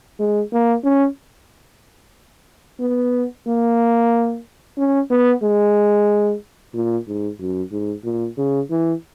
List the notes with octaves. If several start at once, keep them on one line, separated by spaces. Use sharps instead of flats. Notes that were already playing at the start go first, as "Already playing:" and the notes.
G#3
A#3
C#4
B3
A#3
C#4
B3
G#3
A#2
G#2
F#2
G#2
A#2
C#3
E3